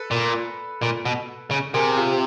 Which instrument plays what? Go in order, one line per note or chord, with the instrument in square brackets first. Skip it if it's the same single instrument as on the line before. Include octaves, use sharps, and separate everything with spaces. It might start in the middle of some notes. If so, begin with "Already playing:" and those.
Already playing: [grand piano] A4 B4
[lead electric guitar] A#2
A#2
B2
C#3
[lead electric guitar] C3 [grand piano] G#4 A#4
[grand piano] G#4
F4 G4